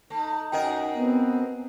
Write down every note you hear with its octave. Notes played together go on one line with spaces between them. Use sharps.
A3 D#4
F#2 G#4 A#4 D#5 F#5 G5
B3 C4